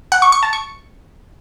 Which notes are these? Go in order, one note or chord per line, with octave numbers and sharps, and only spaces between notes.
F#5
C#6
C#6
A5
C#6